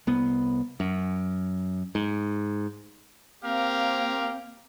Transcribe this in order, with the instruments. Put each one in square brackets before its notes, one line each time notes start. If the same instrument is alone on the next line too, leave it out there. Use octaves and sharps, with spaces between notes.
[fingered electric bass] C2 B3
F#2
G#2
[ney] A#3 [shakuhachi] C4 [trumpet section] G4 A#4 F5